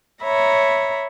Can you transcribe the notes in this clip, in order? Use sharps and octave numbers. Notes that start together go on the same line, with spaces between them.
C#5 E5 A#5 B5